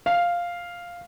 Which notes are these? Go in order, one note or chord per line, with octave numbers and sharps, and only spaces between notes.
F5